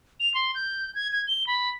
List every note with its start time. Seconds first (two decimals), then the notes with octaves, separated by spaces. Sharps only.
0.20 F7
0.34 C6
0.55 G6
0.95 G#6
1.13 G#6
1.27 G7
1.47 B5